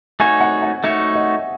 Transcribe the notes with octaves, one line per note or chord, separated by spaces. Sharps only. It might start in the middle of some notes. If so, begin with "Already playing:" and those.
A3 D#4 F#4 C#5 G#5
F#5
F#5
A3 D#4 F#4 C#5 E5
D#5